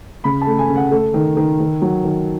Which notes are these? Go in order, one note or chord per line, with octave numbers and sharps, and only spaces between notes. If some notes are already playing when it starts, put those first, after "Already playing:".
C#3 B5
A3 A5
G#5
C#3
F#5
A3 A4
D#3
D#3
D#3
F#3
D#3